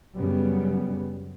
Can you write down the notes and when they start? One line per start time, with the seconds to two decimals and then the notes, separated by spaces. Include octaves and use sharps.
0.16 F#2 C#3 G3 B3